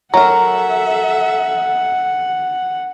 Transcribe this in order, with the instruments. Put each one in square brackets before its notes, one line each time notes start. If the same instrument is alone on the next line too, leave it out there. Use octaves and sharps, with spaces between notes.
[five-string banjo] F#3 A#4 [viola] A4 E5 [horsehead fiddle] F#5 [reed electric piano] A#5